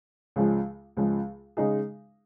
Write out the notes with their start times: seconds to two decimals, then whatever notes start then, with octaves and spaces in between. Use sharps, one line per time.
0.36 C#2 C#3 F3 G#3
0.97 C#2 C#3 F3 G#3
1.57 C#3 G#3 D#4 G#4